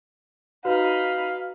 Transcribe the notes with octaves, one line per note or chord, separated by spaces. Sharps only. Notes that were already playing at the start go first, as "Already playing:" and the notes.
D#4 F#4 B4 F5 B5